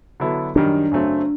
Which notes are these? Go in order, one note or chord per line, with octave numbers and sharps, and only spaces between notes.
D3 F#3 B3 E4 A4
F#2 D#3 G3 D4
F#2 C#3 F#3 A3 C4